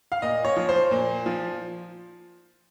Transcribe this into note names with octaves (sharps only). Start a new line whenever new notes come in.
F5
A#2 D#5
C#5
F3
C5
A#2
F3